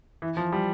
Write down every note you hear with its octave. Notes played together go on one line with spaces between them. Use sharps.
E3
F3
G3